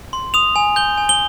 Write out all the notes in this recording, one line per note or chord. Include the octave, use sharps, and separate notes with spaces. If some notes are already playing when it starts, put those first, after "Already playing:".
C6
D#6 F7
G#5
G6 G7
G#5
G7